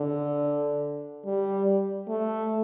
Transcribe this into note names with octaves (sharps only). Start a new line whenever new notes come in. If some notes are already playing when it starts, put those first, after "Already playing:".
Already playing: D3
G3
A3